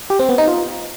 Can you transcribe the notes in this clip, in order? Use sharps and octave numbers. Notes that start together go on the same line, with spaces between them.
G4
C4
B3
D#4
F4